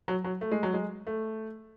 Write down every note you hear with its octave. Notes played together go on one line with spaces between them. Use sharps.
F#3
F#3
A3
G#3
F#3
G#3
A3